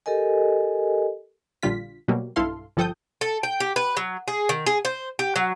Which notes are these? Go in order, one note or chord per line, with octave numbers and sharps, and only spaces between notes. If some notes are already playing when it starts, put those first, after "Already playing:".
G4 A4 A#4 D#5 G#5
A#1 D3 G3 F4 B6
B2 F#3 G3 A#3
B1 G2 E4 A4 F5 C6
G1 F3 A4 G5 D#6 G6
A4
G5
G4
B4
F#3
G#4
D#3
G#4
C5
G4
F#3